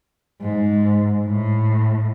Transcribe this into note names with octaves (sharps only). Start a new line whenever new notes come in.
G#2
A2